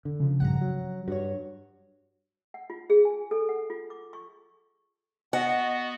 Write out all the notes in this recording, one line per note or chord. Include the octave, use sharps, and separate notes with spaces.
D3
C#3 F3
A#1 G2 F#5 A#5
F#3
G2 F#4 C#5
F#5
F4
G#4
G#5
A4
F#5
F4
D6
C#6
B3 F#4 D#5 F#5